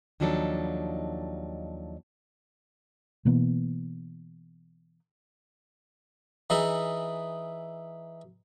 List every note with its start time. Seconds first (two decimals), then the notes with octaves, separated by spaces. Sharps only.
0.20 D#2 F3 F#3 D4 D#4 A4
3.25 B2 E3 A#3 B3
6.50 E3 D#4 E4 G#4